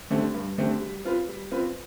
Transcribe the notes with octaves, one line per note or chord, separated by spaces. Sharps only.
D3 A3 C4 G4
G2
D3 A3 C4 G4
G3
C4 F4 B4
G3
C4 F4 B4